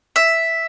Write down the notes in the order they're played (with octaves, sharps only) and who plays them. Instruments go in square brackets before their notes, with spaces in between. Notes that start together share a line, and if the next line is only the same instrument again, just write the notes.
[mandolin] E5